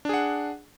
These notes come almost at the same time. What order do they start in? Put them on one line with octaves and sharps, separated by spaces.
D4 G#4 F#5